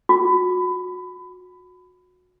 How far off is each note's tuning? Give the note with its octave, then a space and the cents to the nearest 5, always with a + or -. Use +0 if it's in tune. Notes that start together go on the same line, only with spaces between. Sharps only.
F#4 -25